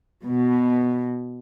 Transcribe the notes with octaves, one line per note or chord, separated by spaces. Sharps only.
B2